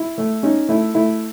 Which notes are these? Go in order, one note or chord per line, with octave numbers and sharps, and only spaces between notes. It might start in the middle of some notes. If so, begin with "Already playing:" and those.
Already playing: E4
A3
C#4 D#4
A3 E4
A3 E4